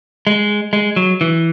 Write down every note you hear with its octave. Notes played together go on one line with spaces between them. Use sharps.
G#3
G#3
F#3
E3